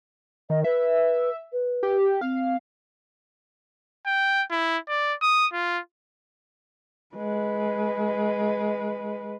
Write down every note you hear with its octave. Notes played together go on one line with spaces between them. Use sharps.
D#3 D#5
B4 E5
B4
G4
C4 F5
G5
E4
D5
D#6
F4
G#3 B4